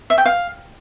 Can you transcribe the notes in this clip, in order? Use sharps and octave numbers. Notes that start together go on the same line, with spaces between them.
E5
G5
F5